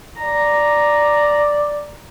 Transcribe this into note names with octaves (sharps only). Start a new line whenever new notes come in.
D5 A#5